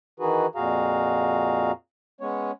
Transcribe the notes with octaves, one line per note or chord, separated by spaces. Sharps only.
D#3 E3 D#4 F#4 G#4 B4
F2 A#2 F#4 G#4 F5 A#5
G#3 B3 C#4 C#5